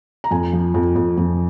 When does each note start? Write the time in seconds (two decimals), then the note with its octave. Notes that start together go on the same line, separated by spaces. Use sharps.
0.24 A#5
0.31 F2 G#5
0.53 F3
0.74 F2
0.96 F2
1.18 F2